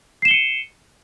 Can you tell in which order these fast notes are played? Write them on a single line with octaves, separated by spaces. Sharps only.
C7 E7 G7 C#7 D#7